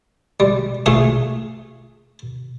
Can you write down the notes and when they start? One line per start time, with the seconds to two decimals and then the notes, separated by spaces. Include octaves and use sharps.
0.40 G3
0.86 A3 F4 G#4 C6